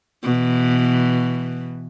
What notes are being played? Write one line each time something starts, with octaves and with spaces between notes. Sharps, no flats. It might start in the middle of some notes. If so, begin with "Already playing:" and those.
B2 E3